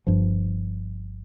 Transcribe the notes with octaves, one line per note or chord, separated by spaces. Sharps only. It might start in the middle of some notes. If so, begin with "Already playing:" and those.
G1 G2 F3